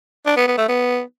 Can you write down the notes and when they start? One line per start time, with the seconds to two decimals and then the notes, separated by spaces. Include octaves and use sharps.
0.26 D4
0.37 B3
0.47 B3
0.58 A3
0.69 B3